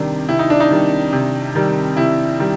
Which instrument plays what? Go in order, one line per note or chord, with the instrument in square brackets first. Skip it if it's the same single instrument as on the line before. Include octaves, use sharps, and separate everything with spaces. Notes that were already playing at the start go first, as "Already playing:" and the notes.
Already playing: [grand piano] C3 D#3 G3 D4
C3 E4
D#4
D4
D#4
D#3 G3
C3
D#3 G3
C3 E4
D#3 G3